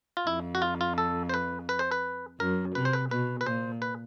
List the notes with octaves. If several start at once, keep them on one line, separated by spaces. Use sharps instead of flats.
F4
F2 E4
F#4
F4
F4
A4
C5
B4
B4
C5
B4
F#2 A#4
C3 B4
C5
B4
B2 B4
B4
A#2 C5
B4